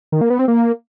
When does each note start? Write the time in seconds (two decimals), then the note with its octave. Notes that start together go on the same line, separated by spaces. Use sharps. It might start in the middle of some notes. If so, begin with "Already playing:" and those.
0.12 D#3
0.21 A#3
0.30 B3
0.39 C4
0.48 A#3